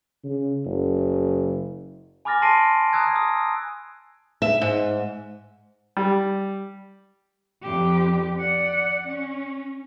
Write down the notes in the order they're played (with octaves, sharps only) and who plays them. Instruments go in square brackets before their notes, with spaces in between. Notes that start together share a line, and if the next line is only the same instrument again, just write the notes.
[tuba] C#3
F#1
[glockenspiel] G#5 B5 D6 F6 A6 A#6
A5 C6 A#6 C7 D7 D#7
A#5 D#6 E6 F#6 G#6
D#6 E6
[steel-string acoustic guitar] E5
G#2
[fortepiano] G3
[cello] F2 G4
D5 F#5
C#4